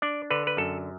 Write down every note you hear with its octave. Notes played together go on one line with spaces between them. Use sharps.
D4 D5
D3 B4
B4
F#2 A4